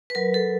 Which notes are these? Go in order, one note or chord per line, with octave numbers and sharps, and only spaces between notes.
B4
F#3 A#4
A4